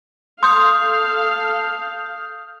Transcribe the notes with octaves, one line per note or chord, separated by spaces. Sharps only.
A4 F5 C6 D#6 G6